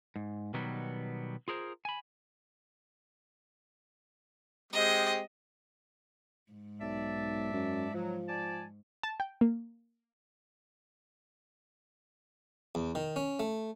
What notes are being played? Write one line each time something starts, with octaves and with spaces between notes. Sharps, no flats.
G#2
B2 D#3 F#3 G3 B3
F4 G#4 A#4 C5
G#5 B5
G#3 C4 G4 D#5
G#2
B1 D5 E5 A5
F#2
F3 F#3
D5 G#5 A5
A5
G5
A#3
E2
D#3
C#4
A3